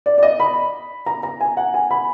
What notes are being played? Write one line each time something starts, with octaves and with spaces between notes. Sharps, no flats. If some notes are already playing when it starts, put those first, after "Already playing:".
D5
D5
D#5
B5
A#5
A#5
G#5
F#5
G#5
B5